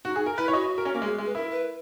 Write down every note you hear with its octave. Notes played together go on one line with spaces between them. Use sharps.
D#4 F#4
G#4
A#4
E4 B4
C#5
F#4 D#5
A#4
C#4
A#3
G#3
G#3
B4
E4 A#4
B4